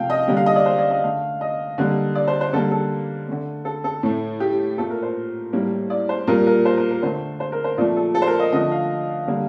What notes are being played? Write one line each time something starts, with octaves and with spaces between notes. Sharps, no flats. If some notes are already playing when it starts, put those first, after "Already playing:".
Already playing: C3 F3 A3 F5 G5 A5
D#5
D3 G3 A#3
F5
D#5
D5
C5
D5
D#5
D3 A3 F5
D#5
D3 G3 A#3
D5
C5
C5
D3 G3 A#3 A4
A4
D3 A3
A4
A4
A2 A3
G4
A#2 A3 A4
A#4
C5
A2 G3 A#3
D5
C5
A#2 G3 A#3 A#4
A#4
C5
A#4
A#4
D3 A3 C5
C5
A#4
C5
A#2 F3 A3 D5
A4
A4
C5
A#4
D#5
D3 F3 A3 D#5
F5
D3 G3 A#3